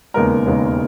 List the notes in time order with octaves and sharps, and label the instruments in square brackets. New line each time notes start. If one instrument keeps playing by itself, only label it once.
[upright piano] E1 D#2 C#3 G#3 B3 A#4
E1 D#2 C#3 G#3 B3